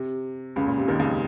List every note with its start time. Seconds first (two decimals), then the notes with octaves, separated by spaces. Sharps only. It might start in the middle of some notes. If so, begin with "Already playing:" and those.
Already playing: C3
0.56 C#2 C#3
0.67 A#2
0.78 C3
0.88 D#2 D#3
0.99 C#2 C#3